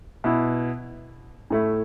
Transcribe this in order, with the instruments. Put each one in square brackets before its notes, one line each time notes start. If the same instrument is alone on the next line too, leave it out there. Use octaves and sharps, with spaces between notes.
[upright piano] B2 B3 E4
A2 A3 E4